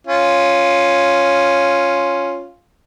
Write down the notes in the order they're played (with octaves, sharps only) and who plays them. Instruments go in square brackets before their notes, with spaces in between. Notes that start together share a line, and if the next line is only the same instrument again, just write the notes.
[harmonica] C#4 F4